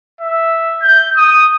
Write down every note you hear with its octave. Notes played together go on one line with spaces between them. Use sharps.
E5
G6
D#6